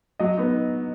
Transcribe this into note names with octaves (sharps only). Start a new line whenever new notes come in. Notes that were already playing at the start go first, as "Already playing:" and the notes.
F#3 D#5
B3 D#4